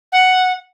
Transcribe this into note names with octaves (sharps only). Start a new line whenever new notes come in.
F#5